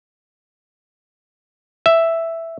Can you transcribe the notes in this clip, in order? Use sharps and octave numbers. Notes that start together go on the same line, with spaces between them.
E5